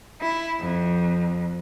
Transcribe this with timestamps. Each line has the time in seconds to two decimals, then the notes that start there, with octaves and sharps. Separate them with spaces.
0.21 E4
0.60 F2